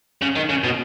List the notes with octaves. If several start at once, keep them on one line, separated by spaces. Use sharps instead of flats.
C#3
D#3
C#3
B2